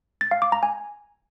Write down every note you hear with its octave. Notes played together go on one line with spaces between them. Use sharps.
A6
F5
D6
A#5
G#5